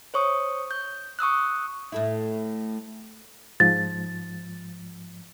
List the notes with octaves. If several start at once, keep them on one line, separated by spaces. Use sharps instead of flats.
C5 C#5 C#6 D#6
G6
C#6 D#6 E6 F#6
A2 A3 E4
G#2 F3 A6